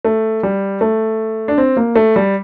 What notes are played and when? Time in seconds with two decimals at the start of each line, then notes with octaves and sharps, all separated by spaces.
0.05 A3
0.43 G3
0.81 A3
1.48 D4
1.58 C4
1.77 A#3
1.96 A3
2.16 G3